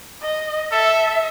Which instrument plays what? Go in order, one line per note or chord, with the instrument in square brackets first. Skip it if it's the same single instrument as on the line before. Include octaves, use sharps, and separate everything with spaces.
[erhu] D#5
[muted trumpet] A4 [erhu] E5